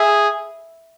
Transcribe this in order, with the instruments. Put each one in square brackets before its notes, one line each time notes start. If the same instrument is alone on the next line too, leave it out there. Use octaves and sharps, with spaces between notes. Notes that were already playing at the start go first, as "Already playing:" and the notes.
Already playing: [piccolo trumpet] G#4 [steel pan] E5